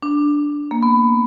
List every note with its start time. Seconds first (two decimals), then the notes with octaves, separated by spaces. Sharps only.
0.02 D4
0.71 A#3
0.83 B3